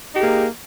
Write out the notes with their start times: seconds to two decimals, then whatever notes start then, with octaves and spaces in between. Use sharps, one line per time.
0.12 D#4
0.15 G4
0.18 G#4
0.21 A#3